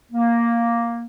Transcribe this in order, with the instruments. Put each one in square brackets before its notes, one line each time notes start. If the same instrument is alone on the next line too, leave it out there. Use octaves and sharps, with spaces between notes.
[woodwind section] A#3